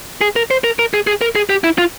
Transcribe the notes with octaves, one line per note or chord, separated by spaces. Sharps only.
G#4
A#4
C5
A#4
A#4
G#4
G#4
A#4
G#4
G4
E4
F4